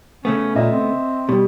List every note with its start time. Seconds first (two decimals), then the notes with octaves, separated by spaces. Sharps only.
0.25 C#3 A3 B3 C#4
0.55 A#2 D#5 E5
0.72 C4
1.29 B2 G3